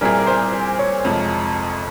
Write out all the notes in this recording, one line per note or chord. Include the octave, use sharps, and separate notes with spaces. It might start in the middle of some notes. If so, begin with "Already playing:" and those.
A#2 G3 C4 E4 G#4 A#4
A#4
C5
C5
C#5
F2 C3 F3 G#3